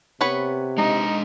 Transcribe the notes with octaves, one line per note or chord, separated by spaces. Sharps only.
C3 B3 B4 C#5
G#3 D4 D#4 D#5